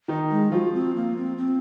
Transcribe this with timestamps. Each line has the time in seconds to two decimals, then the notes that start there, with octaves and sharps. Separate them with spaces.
0.08 D#3 D#4
0.31 G#3
0.52 F3 F4 F#4
0.74 C4
0.95 A#3
1.17 C4
1.37 C4